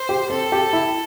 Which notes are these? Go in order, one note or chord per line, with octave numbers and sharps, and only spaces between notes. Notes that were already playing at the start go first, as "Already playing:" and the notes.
Already playing: C5
G4
C4 A4
G4
E4